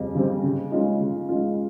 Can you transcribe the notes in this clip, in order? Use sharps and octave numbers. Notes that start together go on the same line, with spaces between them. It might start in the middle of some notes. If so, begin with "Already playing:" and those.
Already playing: F2 C#3 G3
C#3 G3 C4
C#3
G#3 C#4 F4
C#3
G#3 C#4 F4